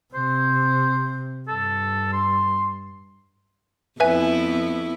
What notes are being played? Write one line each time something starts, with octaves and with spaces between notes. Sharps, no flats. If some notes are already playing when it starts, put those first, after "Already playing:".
C3 C5
G2 A4
C6
F2 B3 E4 B4 E5 G#5